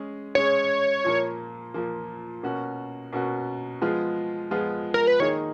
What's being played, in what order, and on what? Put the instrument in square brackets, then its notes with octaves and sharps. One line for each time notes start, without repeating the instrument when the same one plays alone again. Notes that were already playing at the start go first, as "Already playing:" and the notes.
Already playing: [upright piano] G#3 C#4 G#4
[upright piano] G#3 C#4 G#4 [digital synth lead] C#5
[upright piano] A#2 F3 A#3
A#2 F3 A#3
B2 A#3 C#4 F#4
B2 A#3 C#4 F#4
F3 G#3 B3 F4 G#4
F3 G#3 B3 F4 G#4
[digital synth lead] A#4
B4
[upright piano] D#3 A#3 D#4 G#4 [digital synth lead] C#5